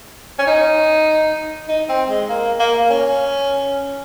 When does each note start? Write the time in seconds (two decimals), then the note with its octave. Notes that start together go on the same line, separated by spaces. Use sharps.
0.39 C#4
0.47 D#4
1.69 D#4
1.89 C4
2.09 G#3
2.29 A#3
2.59 A#3
2.90 C#4